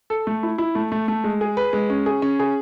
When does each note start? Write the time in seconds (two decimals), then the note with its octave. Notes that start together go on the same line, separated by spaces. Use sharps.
0.10 A4
0.27 A3
0.43 E4
0.58 E4
0.75 A3
0.92 A3
1.08 A3
1.24 G#3
1.41 G#4
1.57 B4
1.73 G#3
1.90 C#4
2.06 G#4
2.22 C#4
2.39 G#4